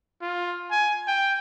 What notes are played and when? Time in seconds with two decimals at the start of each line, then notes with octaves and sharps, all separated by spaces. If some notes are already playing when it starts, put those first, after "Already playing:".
0.22 F4
0.71 G#5
1.07 G5